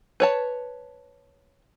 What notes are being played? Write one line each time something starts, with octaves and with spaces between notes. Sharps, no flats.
B4 C#5 A5